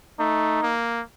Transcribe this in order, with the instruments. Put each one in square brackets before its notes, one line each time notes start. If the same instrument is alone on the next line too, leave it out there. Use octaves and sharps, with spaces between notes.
[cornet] A3 [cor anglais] D#4
[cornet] A#3